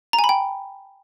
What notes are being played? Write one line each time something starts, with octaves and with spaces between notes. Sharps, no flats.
A#5
G#5
B5
G5